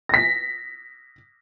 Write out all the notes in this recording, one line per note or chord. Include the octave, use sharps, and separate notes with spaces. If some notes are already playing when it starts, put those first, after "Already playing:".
A#6 B6